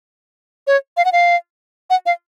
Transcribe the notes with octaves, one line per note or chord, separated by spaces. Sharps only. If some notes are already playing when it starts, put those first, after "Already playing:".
C#5
F5
F#5
F5
F#5
F5